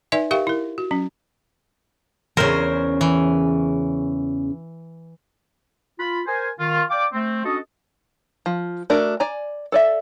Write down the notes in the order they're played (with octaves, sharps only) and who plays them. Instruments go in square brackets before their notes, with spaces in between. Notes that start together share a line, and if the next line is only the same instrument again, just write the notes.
[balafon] D#4 B4 D5 E5 G#5
G4 A#4 E5 F5 G5 C#6
E4 A#4
F#4
F#3 C#4
[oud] E2 C#3 [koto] A#4 C5
[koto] E3
[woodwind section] F4 B5
A#4 C5 G#5
D#3 F4
D5 F5 G5 D6
A3 C4
C#4 D4 F#4 A4 D#5
[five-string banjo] F3
A3 D4 F#4 A#4
D5 G#5 A#5
A4 D5 E5